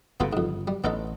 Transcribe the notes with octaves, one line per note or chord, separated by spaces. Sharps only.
G1 C#3 B3 F4 A4
F2 G#2
G3
A1 B3 D#4 A4